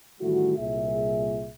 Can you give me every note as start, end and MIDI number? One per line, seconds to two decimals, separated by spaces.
0.21 0.56 33
0.21 0.56 51
0.21 0.56 55
0.21 0.56 57
0.21 0.56 64
0.21 0.56 66
0.58 1.50 36
0.58 1.50 46
0.58 1.50 68
0.58 1.50 76